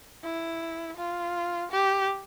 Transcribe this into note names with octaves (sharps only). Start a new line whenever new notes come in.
E4
F4
G4